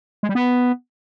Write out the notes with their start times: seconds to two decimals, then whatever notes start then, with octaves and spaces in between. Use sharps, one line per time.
0.23 G#3
0.29 G3
0.35 B3